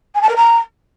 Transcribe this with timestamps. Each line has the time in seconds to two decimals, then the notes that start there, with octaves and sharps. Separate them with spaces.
0.15 G#5
0.22 A5
0.29 A#4
0.36 A#5